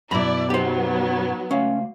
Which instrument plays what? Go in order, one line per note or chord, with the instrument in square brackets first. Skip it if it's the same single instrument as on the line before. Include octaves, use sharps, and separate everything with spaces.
[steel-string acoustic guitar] F#2 B2 [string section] E4 D5 [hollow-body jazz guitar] A#5 B5
[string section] F#3 B3 [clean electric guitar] D#4 [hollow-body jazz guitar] G4 C5
[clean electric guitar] C#2 A3 F5 [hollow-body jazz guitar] C#4